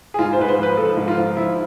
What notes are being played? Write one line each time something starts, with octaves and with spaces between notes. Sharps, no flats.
G#4
G#2 F4
C5
G#2 B4
C5
F3 B4
F3 A4
G#2
F4
F3
F3 E4